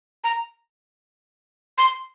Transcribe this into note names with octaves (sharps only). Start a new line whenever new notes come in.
A#5
C6